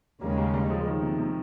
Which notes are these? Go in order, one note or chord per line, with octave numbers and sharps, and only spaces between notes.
D#2 C#3 G3 G#3 A#3
G3 A#3
G3 A#3
F3 G#3
G#3
D#3 G3
C3 D#3
C3